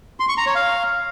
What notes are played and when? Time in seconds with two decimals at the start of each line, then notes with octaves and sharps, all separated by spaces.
0.20 C6
0.29 C#6
0.38 A#5
0.46 C#5
0.55 F5